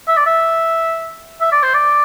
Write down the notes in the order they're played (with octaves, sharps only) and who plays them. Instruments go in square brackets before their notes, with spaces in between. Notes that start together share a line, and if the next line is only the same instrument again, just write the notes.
[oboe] E5
D5
E5
E5
D5
C5
D5